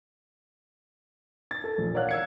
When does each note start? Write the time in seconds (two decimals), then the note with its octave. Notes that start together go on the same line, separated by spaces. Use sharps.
1.51 A6
1.64 A4
1.78 A#1
1.94 A#4 C#5 D5 F5 F#5 F#6
2.09 E6 G#6 C#7